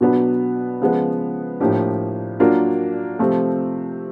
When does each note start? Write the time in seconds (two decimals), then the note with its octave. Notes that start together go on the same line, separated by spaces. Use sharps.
0.01 B2 F#3 B3 D4
0.81 C#3 F3 G#3 B3
1.60 A2 F3 A#3 D4 G4
2.40 F#3 A#3 D4 F4 A#4
3.19 C3 F3 A3 C4